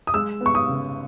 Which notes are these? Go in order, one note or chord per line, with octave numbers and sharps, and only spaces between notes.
D#6
G#3 E6
B3
C#6
D#6
C#3